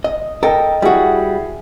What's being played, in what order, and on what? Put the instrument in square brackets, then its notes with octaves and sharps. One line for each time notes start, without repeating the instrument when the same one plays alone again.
[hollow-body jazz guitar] D#5
[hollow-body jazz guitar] A4 A#4 [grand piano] D#5 G5
[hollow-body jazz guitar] G3 F#4 [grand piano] E4 G#4 E5